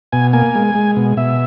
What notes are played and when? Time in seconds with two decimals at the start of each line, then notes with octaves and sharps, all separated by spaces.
0.12 B2 G#5
0.33 A#3 G#5
0.55 G#3
0.75 G#3
0.97 B2
1.17 B2 E5